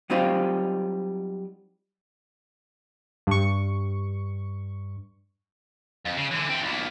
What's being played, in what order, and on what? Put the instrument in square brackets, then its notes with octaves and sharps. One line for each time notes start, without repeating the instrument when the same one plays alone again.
[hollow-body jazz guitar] F#3 G3 C4 D#4 F4 G4
[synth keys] G2 C#6
[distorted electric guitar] F2
C#3
D3 E3
E3 C4
B1 A#2